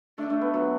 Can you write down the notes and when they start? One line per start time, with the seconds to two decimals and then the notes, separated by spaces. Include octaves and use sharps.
0.18 A3 D4
0.30 A3
0.41 B3
0.54 F#3